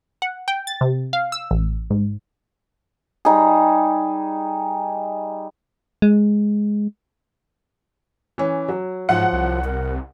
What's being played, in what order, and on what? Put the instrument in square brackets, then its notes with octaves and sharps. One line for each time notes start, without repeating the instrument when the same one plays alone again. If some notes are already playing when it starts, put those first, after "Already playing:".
[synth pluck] F#5
G5
A6
C3
F5
E6
A1
G#2
[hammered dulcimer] G3 D#4 G#4
[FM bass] G#3
[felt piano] E3 C#4
F#3
[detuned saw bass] G#2 [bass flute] F3 [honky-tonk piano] F#5
[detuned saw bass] C2
[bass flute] A#4